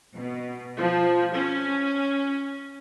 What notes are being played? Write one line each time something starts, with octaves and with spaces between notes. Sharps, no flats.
B2
F3
C#4